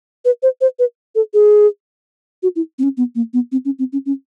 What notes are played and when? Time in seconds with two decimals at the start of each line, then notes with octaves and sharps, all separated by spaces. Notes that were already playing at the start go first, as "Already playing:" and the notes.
0.25 B4
0.43 C5
0.61 C5
0.79 B4
1.15 A4
1.34 G#4
2.43 F#4
2.56 E4
2.79 C4
2.83 C#4
2.97 B3
3.15 A#3
3.33 B3
3.52 C4
3.65 C#4
3.79 C4
3.93 C#4
4.06 C#4